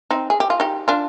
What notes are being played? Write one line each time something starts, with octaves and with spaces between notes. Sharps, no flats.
C4 D#4
G#4
G4
F4
D#4 G4
D4 F4